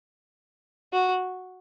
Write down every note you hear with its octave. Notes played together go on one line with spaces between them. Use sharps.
F#4